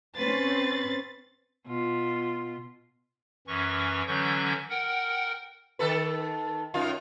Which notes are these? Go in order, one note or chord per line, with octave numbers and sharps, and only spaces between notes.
C4 C#4 B4 C5 A6
B2 F4
F#2 E3 C#4 C#6
D3 E3 F#3 C#4 C#6 G6
A#4 F#5 G5
D#3 A4 B4
F#2 D#4 F4